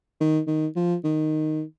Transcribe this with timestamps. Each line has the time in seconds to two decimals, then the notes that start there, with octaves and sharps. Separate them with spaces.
0.20 D#3
0.47 D#3
0.76 F3
1.04 D#3